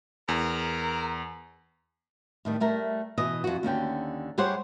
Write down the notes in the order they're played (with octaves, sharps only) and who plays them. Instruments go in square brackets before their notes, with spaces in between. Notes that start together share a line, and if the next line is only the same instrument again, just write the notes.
[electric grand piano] E2 [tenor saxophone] A#4
[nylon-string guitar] A2 D#3 G3
G3 A3 A#4
B2 E3 D#5
F2 F#4
D#2 D3 C#4 G5
G3 G4 G#4 C5 C#5 F#5